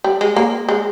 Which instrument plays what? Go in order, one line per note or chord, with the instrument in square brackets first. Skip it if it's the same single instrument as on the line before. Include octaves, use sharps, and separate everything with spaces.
[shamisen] G3
G#3
A#3
G#3